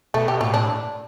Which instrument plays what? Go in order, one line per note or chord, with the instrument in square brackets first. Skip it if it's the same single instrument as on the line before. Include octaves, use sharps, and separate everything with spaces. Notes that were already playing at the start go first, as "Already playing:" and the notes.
[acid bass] B2 [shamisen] A3
[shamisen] G4
[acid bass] A2 [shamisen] F4
[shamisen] D4